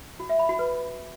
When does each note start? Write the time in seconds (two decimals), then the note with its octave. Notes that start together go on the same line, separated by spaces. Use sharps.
0.20 F#4
0.29 E5
0.39 B5
0.49 F#4
0.59 B4